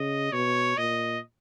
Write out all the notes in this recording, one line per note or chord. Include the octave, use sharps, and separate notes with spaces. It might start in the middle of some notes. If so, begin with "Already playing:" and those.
Already playing: C#3 D#5
B2 C#5
A#2 D#5